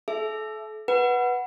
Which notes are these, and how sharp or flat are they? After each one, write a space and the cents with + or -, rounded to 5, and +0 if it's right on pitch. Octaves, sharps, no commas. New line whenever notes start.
A4 -35 E5 +15
B4 -10 F#5 +0